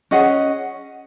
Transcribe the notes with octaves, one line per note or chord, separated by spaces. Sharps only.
C#4 G#4 D#5 F#5